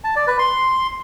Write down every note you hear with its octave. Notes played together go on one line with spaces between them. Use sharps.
A5
D5
B4
C6